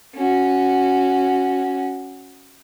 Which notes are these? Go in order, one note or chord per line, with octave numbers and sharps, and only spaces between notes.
C#4 F#4